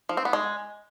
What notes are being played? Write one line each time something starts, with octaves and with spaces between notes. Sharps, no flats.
F3
C4
B3
G#3